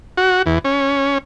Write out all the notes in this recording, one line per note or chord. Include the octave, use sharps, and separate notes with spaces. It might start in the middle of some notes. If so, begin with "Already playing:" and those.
F#4
E2
C#4